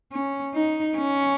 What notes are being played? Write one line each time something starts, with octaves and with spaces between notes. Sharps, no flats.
C#4
D#4
C#4